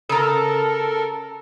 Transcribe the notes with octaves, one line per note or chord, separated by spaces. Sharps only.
C#3 A4 A#4 A#5